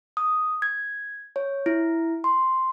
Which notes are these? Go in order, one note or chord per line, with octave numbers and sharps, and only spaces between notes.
D#6
G#6
C#5
E4
C6